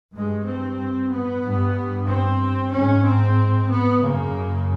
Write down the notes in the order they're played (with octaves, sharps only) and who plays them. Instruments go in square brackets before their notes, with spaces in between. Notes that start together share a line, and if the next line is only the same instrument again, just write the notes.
[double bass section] G2 G#3
C4
B3
G2
C4
G#2 C#4
C4
B3
F#2 C#3 A#3